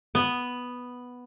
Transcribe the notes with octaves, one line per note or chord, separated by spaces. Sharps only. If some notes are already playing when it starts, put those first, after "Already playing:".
B3